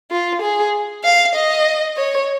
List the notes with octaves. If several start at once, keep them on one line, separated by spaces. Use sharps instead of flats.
F4
G#4
F5
D#5
C#5